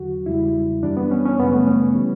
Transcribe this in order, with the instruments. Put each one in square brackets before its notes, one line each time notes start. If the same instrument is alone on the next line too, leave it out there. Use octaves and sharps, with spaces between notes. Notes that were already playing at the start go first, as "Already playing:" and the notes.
Already playing: [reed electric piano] E2 D3 F#3 F#4
E2 C#3 G3 E4
F#2 E3 G3 D4
B3
C#4
C#4
F#2 C#3 G3 B3
A3
C#4
E3 G3